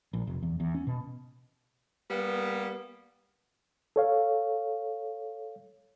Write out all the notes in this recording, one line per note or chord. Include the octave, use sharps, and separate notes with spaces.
A#1
F1
E2
E2
C#4
B2
G3 A#3 B3
A4 C#5 F5